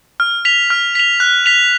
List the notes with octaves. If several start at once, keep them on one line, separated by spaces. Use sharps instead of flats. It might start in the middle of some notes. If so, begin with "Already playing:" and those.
F6
B6 F7
F6
B6 F7
F#6
B6 F7